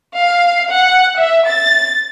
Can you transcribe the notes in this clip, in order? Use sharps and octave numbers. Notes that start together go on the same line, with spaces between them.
F5
F#5
E5
A6